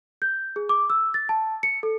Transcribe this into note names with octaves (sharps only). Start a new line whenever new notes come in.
G6
G#4
D6
E6
A6
A5
C#7
A4